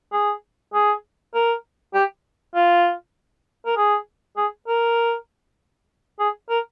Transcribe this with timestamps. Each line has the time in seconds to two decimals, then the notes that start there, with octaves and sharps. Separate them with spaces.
0.13 G#4
0.74 G#4
1.34 A#4
1.94 G4
2.55 F4
3.66 A#4
3.77 G#4
4.37 G#4
4.68 A#4
6.19 G#4
6.50 A#4